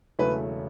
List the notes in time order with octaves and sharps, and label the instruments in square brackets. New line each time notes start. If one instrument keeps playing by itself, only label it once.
[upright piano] E1 E2 C#3 F#3 A3 B4